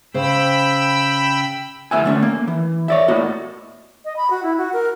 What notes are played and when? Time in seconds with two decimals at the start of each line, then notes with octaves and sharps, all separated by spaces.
0.14 C#3 C5 G5 B5 E6
1.91 D2 A2 E5 G#5
2.04 D3 A3 C4 C#4
2.23 A#3
2.48 E3
2.88 C#5 D5 E5
3.08 A2 A#3 F#4 D#5
4.05 D#5
4.16 B5
4.30 F#4
4.43 E4
4.58 F#4
4.73 A#4